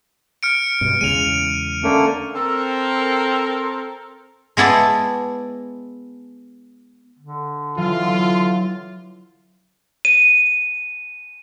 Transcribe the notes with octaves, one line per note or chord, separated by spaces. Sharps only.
F6 C#7 D7
G2 B2
E2 C#3 G#3 D#7 F7
D3 A3 A#3 C#4
C4 A4 A#4
G#3 B3 E4 D5 A5
D3
E3 F#3 F4
D#7